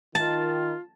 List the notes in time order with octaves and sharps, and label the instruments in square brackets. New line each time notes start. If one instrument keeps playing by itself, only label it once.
[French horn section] D#3 [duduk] F4 [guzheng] A5